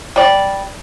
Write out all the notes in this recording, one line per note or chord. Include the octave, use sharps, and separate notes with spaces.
G3 D5